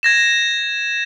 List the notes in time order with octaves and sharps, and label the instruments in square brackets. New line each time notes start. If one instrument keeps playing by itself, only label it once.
[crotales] G#6 A#6 E7